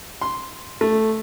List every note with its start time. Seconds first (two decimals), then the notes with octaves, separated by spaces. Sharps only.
0.21 C6
0.81 A3